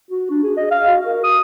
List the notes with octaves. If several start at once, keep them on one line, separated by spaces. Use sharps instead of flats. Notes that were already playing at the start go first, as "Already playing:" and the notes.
F#4
D4
G#4
D#5
F5
F#4
A#4
D#6